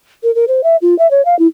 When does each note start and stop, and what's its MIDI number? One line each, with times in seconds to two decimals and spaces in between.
0.23 0.33 70
0.35 0.45 70
0.48 0.63 72
0.64 0.76 76
0.82 0.97 65
0.99 1.10 76
1.11 1.24 73
1.25 1.37 77
1.39 1.47 64